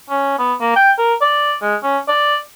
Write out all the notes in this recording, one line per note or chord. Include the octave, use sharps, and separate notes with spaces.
C#4
B3
A#3
G5
A#4
D5
G#3
C#4
D5